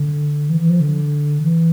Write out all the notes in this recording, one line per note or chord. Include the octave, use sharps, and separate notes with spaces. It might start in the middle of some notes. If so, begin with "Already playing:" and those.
Already playing: D3
E3
E3
F3
D3
E3